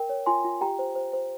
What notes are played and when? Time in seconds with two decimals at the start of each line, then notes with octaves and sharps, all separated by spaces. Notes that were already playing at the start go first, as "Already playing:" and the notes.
Already playing: A#4 G5
0.09 C#5
0.26 F4 G#5 C6
0.44 F4
0.61 G4 G5 A#5
0.79 C5
0.95 C5
1.13 C5